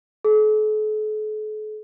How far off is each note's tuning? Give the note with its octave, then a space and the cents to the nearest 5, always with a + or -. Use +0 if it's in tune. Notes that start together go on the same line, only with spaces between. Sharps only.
A4 -45